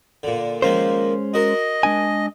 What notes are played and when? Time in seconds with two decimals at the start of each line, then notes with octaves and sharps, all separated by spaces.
0.23 A#2 D3
0.62 D#3 F3 G#3 A#3 C#4 C5
1.34 F#4 A#4 D#5
1.83 G#3 D4 G#5